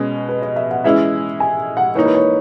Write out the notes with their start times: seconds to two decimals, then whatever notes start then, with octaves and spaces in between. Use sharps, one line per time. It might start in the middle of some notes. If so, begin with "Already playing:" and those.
Already playing: B2 G#3 C#4
0.29 B4
0.42 D#5
0.56 E5
0.70 F#5
0.84 E3 G#3 C#4 E4 E5
1.40 G#5
1.77 F#5
1.95 E3 A#3 D#4 C#5
2.05 B4
2.15 C#5